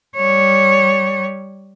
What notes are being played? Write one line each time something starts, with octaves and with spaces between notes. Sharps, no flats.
G3 C#5